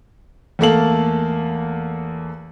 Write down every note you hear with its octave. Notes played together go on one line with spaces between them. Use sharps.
E2 A3 A#3 A4 F5 F#7